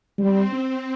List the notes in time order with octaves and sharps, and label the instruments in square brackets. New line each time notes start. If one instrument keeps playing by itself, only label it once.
[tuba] G3 [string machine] C4
[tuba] C4